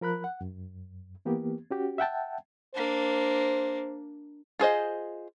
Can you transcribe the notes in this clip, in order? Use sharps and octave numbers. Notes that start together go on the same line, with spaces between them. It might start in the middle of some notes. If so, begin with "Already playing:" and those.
F3 A#4 B5 F#6
F#5
F#2
E3 A#3 B3 G4
C#4 F#4 G4
E5 F#5 G5 A5
A#3 D4 C5
F4 G#4 C5 D#5